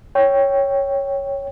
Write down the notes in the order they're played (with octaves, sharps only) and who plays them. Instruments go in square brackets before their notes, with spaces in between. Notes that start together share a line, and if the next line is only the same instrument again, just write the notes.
[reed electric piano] C#5 G5